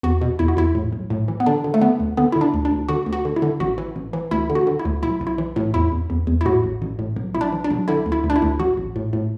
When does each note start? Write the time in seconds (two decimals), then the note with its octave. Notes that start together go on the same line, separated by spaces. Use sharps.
0.03 E2 F#4
0.21 B2
0.39 E2 E4
0.48 F#4
0.57 E2 E4
0.75 A2
0.93 B1
1.10 A2
1.28 E3
1.40 B3
1.46 D3 D4
1.64 D3
1.74 A3
1.82 D3 B3
2.00 D2
2.17 D3 B3
2.32 D3 E4
2.41 D4
2.54 D2
2.65 D4
2.71 D2
2.88 D3 F#4
3.06 D2
3.13 F#4
3.25 D3
3.36 E4
3.42 D3
3.60 A1 F#4
3.78 E3
3.96 A1
4.13 E3
4.31 D2 E4
4.50 D3
4.55 F#4
4.67 D3
4.79 E4
4.85 D2
5.02 B1 E4
5.21 B1
5.27 E4
5.38 E3
5.56 A2
5.74 E2 E4
5.92 E2
6.10 E2
6.27 E2
6.41 E4
6.45 A2 F#4
6.64 A1
6.82 A1
6.99 A2
7.16 B1
7.35 B1 E4
7.41 D4
7.52 E3
7.64 D4
7.71 B1
7.88 D3 E4
8.06 D2
8.12 E4
8.24 D2
8.30 D4
8.36 E4
8.42 D2
8.59 A1 F#4
8.77 A1
8.96 A2
9.13 A2